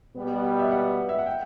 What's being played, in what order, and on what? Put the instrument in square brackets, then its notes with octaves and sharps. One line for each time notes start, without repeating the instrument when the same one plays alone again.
[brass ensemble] B2 G3 B3
[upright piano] E5
F#5
E5
F#5
G5